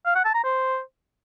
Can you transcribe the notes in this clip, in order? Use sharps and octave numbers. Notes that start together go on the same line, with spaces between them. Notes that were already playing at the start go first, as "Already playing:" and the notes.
F5
F#5
A5
A#5
C5